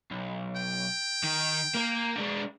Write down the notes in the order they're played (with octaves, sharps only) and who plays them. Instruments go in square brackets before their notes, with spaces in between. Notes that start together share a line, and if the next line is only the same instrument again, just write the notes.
[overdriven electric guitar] B1
[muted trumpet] G5
[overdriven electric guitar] D#3
A#3 A#4
G#3 D4